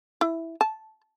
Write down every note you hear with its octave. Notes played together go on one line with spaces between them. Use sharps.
E4
A5